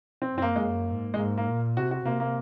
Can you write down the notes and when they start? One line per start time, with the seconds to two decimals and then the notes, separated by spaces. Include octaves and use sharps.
0.22 C4
0.32 F#2
0.38 C4
0.42 A#3
0.56 G#3
0.61 F#2 A#3
0.90 G#2
1.14 G#3
1.18 G#2 A#3
1.38 A#3
1.47 A#2
1.77 C3 F#4
1.91 F#4
2.05 C3 A#3
2.20 A#3